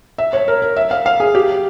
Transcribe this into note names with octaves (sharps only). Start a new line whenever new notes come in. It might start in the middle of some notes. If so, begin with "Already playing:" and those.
E5
C#5
A#4
A#4
E5
F5
F5
G#4
G4